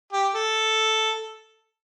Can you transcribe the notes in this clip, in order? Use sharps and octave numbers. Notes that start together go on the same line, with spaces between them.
G4
A4